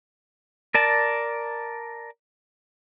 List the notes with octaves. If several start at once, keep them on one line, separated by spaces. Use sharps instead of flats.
A#4 D5 A5